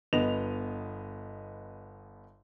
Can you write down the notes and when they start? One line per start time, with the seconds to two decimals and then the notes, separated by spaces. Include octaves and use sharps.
0.13 G1 B3 D#5 F7